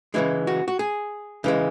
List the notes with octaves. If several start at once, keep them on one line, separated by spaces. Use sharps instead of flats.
C#3 E3 G#3 E4
F#4
F#4
G#4
C#3 E3 G#3